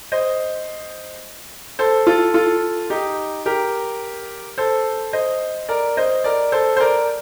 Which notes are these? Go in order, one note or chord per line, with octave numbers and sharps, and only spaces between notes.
C5 D#5
A4 C5
F4 A4
F4 A4
D#4 G4
G4 A#4
A4 C5
C5 D#5
A#4 D5
C5 D#5
A#4 D5
A4 C5
C5
A#4 D5